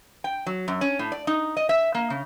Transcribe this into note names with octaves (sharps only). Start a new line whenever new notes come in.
G5
F#3
F#2
C#4
A2
D5
D#4
D#5
E5
A#3
C#3